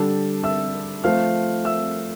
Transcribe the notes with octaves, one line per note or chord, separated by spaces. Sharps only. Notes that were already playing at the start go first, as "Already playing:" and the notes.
Already playing: D3 G3 D4 A4 A5
E5 E6
F3 A3 C4 F5 F6
E5 E6